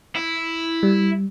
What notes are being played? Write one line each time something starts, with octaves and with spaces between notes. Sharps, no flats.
E4
G3